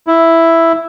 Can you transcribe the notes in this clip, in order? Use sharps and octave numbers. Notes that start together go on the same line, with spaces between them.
E4